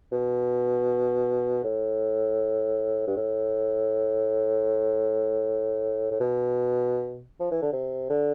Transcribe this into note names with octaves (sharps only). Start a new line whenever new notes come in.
B2
A2
G2
A2
A2
B2
F3
E3
D3
C3
D3